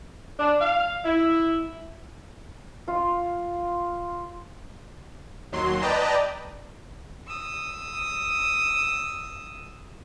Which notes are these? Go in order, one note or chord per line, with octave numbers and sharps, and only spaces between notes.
D4
F5
E4
F4
D#2 F#3 C6
B4 D5 D#5 G5 A5 A#5
D#6 E6